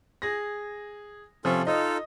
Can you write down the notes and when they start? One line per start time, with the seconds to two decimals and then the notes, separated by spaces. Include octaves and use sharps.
0.22 G#4 A#6
1.45 C3 F3 C#4 F4 A4
1.67 D#4 F4 A4 D#5